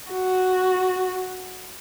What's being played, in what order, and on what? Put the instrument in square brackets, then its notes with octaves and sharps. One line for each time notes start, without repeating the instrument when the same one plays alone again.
[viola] F#4